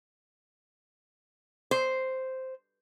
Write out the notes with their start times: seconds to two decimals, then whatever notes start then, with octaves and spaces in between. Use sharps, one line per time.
1.71 C5